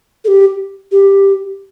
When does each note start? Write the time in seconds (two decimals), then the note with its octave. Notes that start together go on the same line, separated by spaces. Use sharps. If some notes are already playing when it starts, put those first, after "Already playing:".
0.24 A4
0.28 G4
0.92 G4